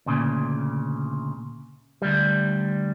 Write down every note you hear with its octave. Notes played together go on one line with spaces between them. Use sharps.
D2 A#2 C#3
D2 G3